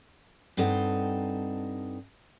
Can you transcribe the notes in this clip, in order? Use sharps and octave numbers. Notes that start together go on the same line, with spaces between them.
G2 C4 D#4 A4 D#5 F#5